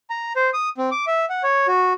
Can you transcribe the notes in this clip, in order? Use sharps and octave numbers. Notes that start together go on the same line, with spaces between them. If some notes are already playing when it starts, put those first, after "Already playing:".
A#5
C5
D#6
C4
D6
E5
F#5
C#5
F#4